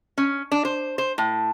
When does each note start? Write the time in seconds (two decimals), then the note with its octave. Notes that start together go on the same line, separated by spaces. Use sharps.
0.18 C#4
0.52 D4
0.65 C5
0.98 C5
1.18 A2